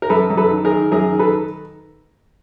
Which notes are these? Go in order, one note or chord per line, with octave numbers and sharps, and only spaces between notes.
A#4
F#2 A4 B4
F#2
A4 B4
D#3
G#4 A#4
D#3
F#2 G#4 A#4
D#3
A4 B4